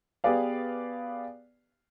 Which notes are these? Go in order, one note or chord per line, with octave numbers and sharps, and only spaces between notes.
B3 G4 G#4 B4 D5 F5